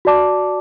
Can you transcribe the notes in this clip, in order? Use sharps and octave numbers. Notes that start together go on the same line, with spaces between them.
F#4 D5 A5 D6